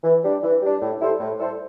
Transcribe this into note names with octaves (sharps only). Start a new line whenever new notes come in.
E3
G3 D4
E3
G3 D4
A2
G3 E4 A4 C5
A2
G3 E4 A4 C5